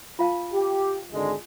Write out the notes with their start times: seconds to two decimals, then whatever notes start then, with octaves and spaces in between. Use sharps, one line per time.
0.19 F4 F5 A5
0.54 G4
1.13 G#1 D3 G#3